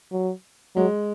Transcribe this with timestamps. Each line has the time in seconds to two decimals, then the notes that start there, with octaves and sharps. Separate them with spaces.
0.12 F#3
0.76 F#3 G#3